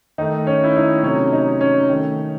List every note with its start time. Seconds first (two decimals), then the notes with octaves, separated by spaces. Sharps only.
0.18 D#3 A3 D#4
0.47 C#4
0.64 E4
0.76 D#4
1.03 C3 F#3 A3 C#4
1.33 D#4
1.61 C#4
1.89 D#3 A3